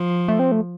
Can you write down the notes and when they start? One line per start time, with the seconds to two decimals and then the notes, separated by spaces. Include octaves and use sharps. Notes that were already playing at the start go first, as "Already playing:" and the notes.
Already playing: F3
0.28 A3
0.39 C4
0.52 A3